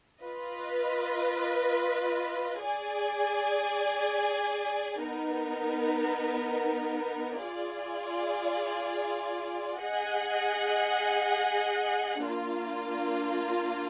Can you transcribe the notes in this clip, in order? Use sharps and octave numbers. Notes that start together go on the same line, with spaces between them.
F4 B4 D#5
G#4 D5 G#5
B3 D#4 A#4
F4 G#4 D5
G#4 D#5 F#5
A#3 D4 F4